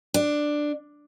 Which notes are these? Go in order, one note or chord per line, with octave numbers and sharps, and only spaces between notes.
D4